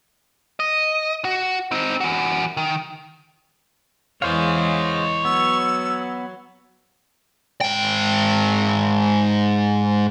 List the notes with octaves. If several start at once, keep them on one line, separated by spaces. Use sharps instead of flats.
D#5
F#4
C4 D#4
E3 F#4
D#3
E2 E3 G#3 G#4 C5 C#5 D#5 F5
F#3 B3 E6
G#2 G5